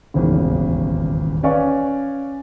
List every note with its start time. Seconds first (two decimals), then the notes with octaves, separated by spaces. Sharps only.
0.14 D#1 G#1 E2 C#3
1.43 C#4 B4 D5 F5 G#5 C#6